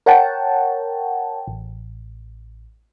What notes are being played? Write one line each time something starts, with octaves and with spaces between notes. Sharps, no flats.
A#4 C#5 F#5 G5 A5
A1